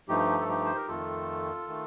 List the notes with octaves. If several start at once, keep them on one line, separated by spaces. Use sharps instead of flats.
G2 F3 A3 D#4 G4
A4
D#4 G4
C5
A#4
F2 D#3 A3 F4 A4
D#3 A3